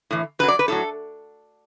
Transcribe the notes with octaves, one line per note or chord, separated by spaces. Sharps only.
A2 E3
F#2 F#3 B4
D5
B4
A2 F#3 A4